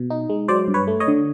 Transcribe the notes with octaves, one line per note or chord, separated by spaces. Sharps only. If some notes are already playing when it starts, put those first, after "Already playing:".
Already playing: B2
D#4
G#3
F#3 C5 D5
G2
B4 C#5
A3
C#5 D#5
D3